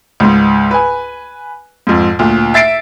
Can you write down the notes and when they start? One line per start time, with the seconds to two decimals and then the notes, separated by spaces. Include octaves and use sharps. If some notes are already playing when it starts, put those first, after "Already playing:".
0.20 C#2 G#2
0.71 B4 G#5
1.87 F2 G#2
2.19 D2 A#2
2.54 E5 A6 C7 D7